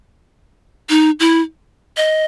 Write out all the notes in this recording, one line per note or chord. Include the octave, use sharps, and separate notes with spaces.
D#4
E4
D#5